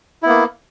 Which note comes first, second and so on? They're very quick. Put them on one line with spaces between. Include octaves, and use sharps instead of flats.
E4 B3 A#3